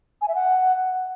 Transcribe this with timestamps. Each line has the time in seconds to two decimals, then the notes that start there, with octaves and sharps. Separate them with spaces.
0.21 G#5
0.28 E5
0.35 F#5